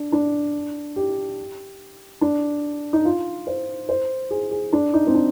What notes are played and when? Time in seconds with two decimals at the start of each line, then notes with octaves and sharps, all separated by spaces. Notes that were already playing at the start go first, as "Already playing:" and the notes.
Already playing: D4
0.12 D4
0.96 G4
2.21 D4
2.93 D#4
3.05 F4
3.47 C5
3.89 C5
4.31 G#4
4.51 G#4
4.73 D4
4.94 D#4
5.07 C4
5.14 D4